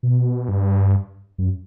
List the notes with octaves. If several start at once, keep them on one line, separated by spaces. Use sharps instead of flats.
B2
G2
F#2